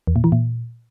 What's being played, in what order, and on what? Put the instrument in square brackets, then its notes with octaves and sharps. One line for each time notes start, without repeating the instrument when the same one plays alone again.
[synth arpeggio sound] E2
A#2
E3
A#2